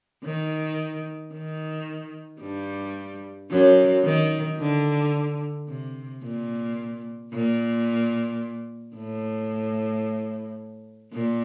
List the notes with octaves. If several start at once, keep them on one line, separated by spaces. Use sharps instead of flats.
D#3
D#3
G2 G3
F#2 F#3
D#3
D3
C3
A#2
A#2
A2
A#2